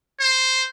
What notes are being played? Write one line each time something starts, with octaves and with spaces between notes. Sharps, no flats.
C5